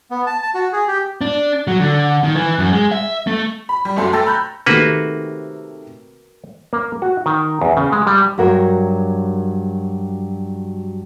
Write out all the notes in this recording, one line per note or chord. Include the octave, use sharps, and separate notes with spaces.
B3
A5
A5
F#4
G#4
G4
D4
F#3
D3
D#3
E3
F#2
G#3
E5
A3
B5
G3
F#1 F#2 A3 F#4 C6
A3 A4 G5 E6 A6 A#6
A#5 B5 F#6 G6
C3 D#3 A3 A#3 F#4 B4
A#3
F#4
D#3
E2
C#3
G#3
G3
G2 F#3 F#4 A#4 C#5